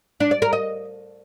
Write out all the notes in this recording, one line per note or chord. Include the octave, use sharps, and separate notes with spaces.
D4
D5
A#4
D#5